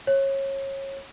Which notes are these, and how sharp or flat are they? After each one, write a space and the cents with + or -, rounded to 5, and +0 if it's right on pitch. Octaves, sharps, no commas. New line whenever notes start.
C#5 -25